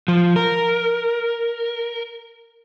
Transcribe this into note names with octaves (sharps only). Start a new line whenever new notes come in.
F3
A#4